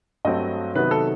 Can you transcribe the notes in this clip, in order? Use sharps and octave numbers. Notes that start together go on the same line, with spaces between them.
G2 F#3 A3 C4 D#5
C3 D#3 F#3 B3 B4
A4